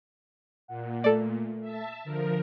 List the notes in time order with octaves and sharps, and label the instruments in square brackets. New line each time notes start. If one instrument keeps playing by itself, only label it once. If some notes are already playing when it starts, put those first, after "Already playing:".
[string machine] A#2 [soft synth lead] F#5
[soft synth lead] A3 [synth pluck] A4 D5
[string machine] E5 A5
[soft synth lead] D3 [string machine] F3 A#4